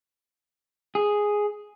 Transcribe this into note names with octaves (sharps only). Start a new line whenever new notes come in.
G#4